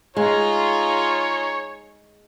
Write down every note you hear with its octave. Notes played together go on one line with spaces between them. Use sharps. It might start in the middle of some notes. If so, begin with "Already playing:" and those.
G#3 D#4 F4 G#4 C#5